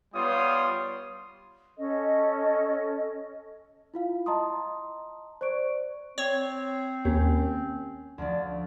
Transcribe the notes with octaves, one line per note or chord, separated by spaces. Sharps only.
G3 B3 F4 C#5 C6 D#6
C#4 A4 D#5
E4 F4 F5
D#5 A5 A#5 C6 D#6
C5 D5 C#6 D7
C4 C#5
D#2 C#4
D2 F3 D5